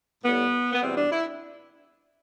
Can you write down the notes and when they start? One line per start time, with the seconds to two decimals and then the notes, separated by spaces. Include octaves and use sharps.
0.24 A2 G3 B3
0.73 B3
0.82 E2 B2 G3 C4
0.96 D4
1.11 E4